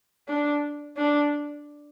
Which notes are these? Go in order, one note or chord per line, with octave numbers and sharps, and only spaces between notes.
D4
D4